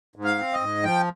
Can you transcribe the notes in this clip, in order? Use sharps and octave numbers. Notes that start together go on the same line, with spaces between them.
G#2
F5
C4
D#5
G#2
F3 G5